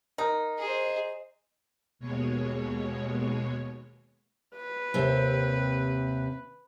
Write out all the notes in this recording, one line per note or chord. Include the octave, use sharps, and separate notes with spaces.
D#4 A#4
G#4 C5 D#5
D#2 B2 G#3 C#5
B4
D#2 C3 C4